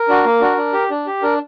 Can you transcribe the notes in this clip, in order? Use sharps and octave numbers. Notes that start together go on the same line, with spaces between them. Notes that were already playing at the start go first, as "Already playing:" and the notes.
Already playing: A#4
D4 F#4
A#3
D4 F#4
D4
G4
D4
G4
D4 A#4